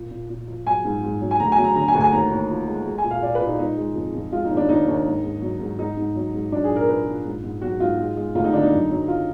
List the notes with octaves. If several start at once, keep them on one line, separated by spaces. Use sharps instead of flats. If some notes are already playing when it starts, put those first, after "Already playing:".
Already playing: A#2
A#2
A#2
F3
F#3 G#5
G#2
G#2
F#3
G#5
D2 A#5
G#5
F#3
A#5
D3 A#5
G#5
D2
G#5
D#2 A#5
D#2
F3
G#3
G#3
G#5
A#2
F5
A#2 D5
B4
A#2
D#4
G#3 D#4
G#3
F2
F2
G#3 F4
D#4
D#2
D4
D#2 D#4
D#2
G#2
G#2
F#3
G#2
G#2 D#4
G#2
F#3
G#2
F#3 D4
G#4
A#2
A#4
A#2 B4
A#2
G#2
G#2
F#3 F#4
G#2 F4
G#3
G#3
D2 F4
D#4
D3 D4
D#4
F#2
F#3
F4